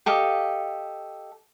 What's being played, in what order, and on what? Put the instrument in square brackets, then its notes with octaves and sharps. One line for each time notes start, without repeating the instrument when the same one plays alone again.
[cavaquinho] G4 A4 D#5 F5